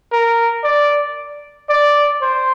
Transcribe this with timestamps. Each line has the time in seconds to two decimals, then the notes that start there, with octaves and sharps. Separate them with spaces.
0.12 A#4
0.64 D5
1.70 D5
2.22 C5